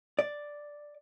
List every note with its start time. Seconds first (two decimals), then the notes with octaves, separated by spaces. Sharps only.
0.19 D5